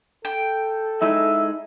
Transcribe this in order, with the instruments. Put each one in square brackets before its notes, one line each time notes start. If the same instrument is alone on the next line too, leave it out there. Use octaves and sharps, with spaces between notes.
[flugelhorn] A4 [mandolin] G5
[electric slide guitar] G#3 D#4 E4 [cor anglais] E5